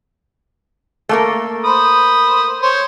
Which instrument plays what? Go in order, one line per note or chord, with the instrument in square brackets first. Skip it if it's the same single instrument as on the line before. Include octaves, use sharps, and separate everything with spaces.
[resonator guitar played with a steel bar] A3 A#3 A#4
[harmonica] C5 B5 D#6
C5 C#5